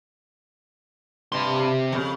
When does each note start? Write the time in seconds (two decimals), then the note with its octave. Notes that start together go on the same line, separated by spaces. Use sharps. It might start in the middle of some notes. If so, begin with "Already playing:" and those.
1.32 G2 C3 C6
1.92 F2 C#3